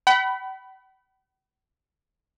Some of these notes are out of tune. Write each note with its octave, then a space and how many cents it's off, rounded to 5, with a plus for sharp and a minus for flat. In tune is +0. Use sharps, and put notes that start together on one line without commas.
F#5 +45 B5 +0